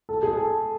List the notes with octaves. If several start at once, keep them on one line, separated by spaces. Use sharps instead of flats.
A4
G#4
A4